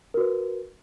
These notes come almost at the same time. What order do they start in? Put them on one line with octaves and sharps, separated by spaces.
A#4 F#4 B4